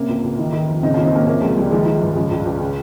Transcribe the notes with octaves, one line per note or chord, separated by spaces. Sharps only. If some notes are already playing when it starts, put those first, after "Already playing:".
Already playing: C3 A#3 C#4
C#2
C#2
D#3
D#3
F2
C#3 C4 D#4
D#2 C#4 F4
C4 D#4
D#2 A#3 C#4
C3 A#3 C#4
C#2 F3 G#3
C#2 G3
D#3 F3 G#3
D#3
G2
C#3 F3 G#3
C#2
C#2
C#3